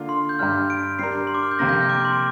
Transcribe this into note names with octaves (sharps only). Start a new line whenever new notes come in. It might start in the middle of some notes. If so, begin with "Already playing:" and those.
Already playing: D3 A#3 D4 F4
C6
G6
G2 G3 D4 F6
D7
G3 D4 A#4 C7
C6
D6
F6
G6
F2 C3 A#3 A#6
G6
F6
D6
C6
D6